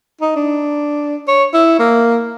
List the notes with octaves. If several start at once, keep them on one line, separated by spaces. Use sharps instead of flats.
D#4
D4
C#5
E4
A#3